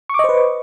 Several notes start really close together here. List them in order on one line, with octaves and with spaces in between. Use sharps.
C#6 D6 D#5 C5 B4